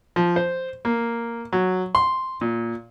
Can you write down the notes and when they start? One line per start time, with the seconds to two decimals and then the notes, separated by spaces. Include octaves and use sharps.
0.16 F3
0.36 C5
0.85 A#3
1.53 F#3
1.95 C6
2.41 A#2